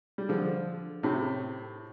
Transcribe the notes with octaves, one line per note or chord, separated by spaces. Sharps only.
G3
D3 F3
A2 C3